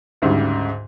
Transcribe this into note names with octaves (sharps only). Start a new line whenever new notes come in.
D2 G#2 C#3 G3